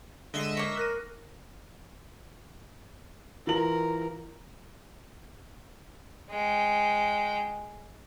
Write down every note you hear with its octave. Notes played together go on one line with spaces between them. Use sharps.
D3 G#3 D#5 E5 E6 C7
A#3 C#5
A#4 F#6 A#6 D#7
E3 F4 A#4 F#7
G#3 G5